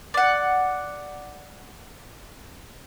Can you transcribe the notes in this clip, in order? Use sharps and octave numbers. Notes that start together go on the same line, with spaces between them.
D5 F#5